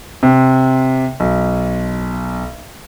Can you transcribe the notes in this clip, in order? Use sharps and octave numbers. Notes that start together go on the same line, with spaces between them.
C3
B1